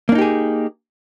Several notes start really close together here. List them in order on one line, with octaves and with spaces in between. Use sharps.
A#3 D4 D#4 G4 G#4